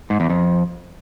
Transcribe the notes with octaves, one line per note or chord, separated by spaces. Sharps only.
G#2
E2
F2